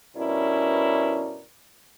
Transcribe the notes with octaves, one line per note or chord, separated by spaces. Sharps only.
G2 B2 C#4 E4 A#4 D5